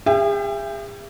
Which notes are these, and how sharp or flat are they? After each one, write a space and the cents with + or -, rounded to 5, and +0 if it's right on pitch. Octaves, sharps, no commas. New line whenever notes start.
G#4 -45 E5 +30 G5 +0